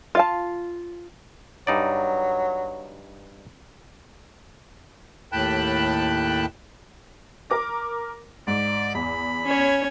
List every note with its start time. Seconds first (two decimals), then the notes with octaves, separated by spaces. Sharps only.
0.15 F4 F5 A5
1.67 G2 F#3 D#4 D5
5.32 D#2 A2 G5 A5 B5 F#6
7.50 A#4 D6 A#6
8.47 G#2 D5
8.94 E2 B5
9.46 C#4 C#5